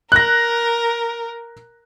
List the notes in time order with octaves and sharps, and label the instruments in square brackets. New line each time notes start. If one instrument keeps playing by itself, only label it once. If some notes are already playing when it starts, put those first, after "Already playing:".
[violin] A#4 [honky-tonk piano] F#6 A#6